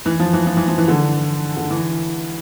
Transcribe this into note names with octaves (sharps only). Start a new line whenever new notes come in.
E3
F3
E3
F3
E3
F3
E3
D3
D3
E3